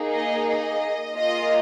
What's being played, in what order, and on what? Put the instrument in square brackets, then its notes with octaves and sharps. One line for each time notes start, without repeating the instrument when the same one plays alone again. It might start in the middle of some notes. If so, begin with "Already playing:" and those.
Already playing: [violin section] A#3 D#4 G#4
D#5
D#5
A#3 F4 G#4 D#5